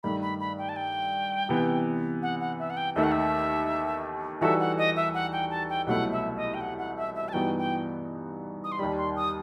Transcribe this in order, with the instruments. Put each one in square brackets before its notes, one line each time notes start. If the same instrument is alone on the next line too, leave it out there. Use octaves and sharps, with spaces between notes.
[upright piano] G2 D#3 A3 [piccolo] B5
[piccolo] B5
B5
G5
A5
G5
[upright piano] C3 E3 B3
[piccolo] F#5
F#5
E5
F#5
G5
[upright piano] D#2 D#3 A3 [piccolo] E5
[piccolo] F#5
E5
[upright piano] E3 G3 D#4 F#4 A4 [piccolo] E5
[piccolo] F#5
D#5
E5
F#5
G5
A5
G5
[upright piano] C2 B2 F#3 A3 E4 [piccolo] F#5
[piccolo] E5
D#5
G5
F#5
F#5
E5
E5
A5
[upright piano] G2 E3 B3 D#4 F#4 [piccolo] G5
[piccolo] G5
D#6
C6
[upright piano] D#2 D#3 G3 [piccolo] B5
[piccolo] C6
D#6